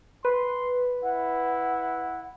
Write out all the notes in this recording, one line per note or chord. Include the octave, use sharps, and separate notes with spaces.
B4 C6
E4 F#5